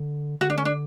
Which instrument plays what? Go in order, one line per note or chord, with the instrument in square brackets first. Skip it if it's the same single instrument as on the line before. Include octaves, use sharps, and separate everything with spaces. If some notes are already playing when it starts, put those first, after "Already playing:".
Already playing: [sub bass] D3
[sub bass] D3 [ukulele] F#4
[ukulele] D4
C#4
D4